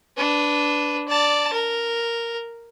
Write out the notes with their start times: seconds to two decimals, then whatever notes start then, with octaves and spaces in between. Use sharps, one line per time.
0.17 D4 B4
1.08 D5 A5
1.53 A#4